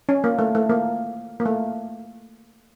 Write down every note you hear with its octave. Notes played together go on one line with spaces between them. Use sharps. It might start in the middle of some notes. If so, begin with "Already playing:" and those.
C#4
A#3
A3
A3
A#3
A#3
A3